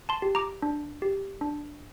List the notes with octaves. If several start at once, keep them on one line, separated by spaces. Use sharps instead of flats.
A5 C6
G4
A#5 D6
D4
G4
D4